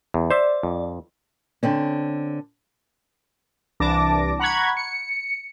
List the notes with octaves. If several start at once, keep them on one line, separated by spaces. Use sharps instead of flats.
E2
C5 D5 E5
F2
D3 C4 C#4
C2 E3 D4 A5 D6 A#6
F#5 A#5 B5 C#6 F#6 G#6
C#7